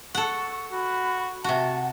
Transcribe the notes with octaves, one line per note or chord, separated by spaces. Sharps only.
A4 F#5 C#6
F#4 B5
C3 F#4 F#5 A5